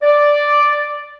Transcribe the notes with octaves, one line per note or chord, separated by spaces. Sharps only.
D5